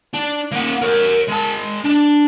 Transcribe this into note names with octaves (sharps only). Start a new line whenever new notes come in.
D4
A#3 F#5
A#4 C#5
G#3 A5
D4